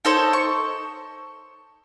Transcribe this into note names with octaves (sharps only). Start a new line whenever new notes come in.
D#4 A4 C5 C#5
C#6